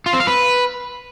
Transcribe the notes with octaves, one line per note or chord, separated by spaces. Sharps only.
F4
C4
F5
B4